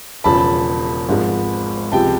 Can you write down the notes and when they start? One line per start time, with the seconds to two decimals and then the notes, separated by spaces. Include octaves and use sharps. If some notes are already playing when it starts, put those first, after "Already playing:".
0.24 E1 E2 C#3 F3 A5 B5
1.09 G#1 G#2 F3 G#3
1.92 C#2 C3 F3 G#3 G5 A5